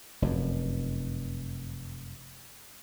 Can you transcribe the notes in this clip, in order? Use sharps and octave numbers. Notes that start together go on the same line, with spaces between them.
F1 F#2